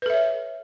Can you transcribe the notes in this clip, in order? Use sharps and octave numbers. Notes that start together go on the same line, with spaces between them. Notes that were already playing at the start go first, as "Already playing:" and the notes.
A4 B4 C#5 E5